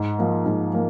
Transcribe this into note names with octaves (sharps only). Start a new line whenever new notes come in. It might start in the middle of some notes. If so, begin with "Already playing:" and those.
Already playing: G#2
F3 A#3
G#2
F3 A#3